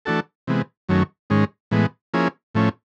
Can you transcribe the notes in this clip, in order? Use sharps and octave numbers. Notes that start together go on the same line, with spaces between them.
E3 A3 D4 F#4 A4
C3 E3 G#3 B3
F#2 D#3 F#3 A3 C#4
G#2 D#3 G#3 C#4
A2 E3 G#3 B3
F3 A#3 C#4 E4 G#4
A2 F3 A3 C#4